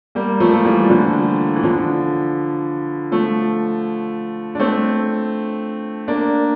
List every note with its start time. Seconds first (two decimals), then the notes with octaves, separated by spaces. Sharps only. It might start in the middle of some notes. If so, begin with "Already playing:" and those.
0.15 G3 A#3
0.40 F3 A3
0.53 A3
0.65 E3 G3
0.90 D3 F3
1.56 E3
1.63 D3 F3
3.12 F3 A3
4.55 D4
4.59 A3 C4
6.08 A#3 D4